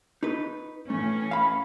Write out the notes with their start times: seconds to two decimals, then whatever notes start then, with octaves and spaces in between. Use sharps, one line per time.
0.23 D#4 B4
0.90 A2 E3 A3 C#4
1.31 F5 B5